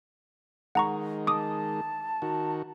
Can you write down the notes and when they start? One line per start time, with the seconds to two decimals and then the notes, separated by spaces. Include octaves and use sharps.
0.75 D#3 G#3 F#5 A#5 C#6
1.27 A5 D6 D#6
2.22 D#3 F#4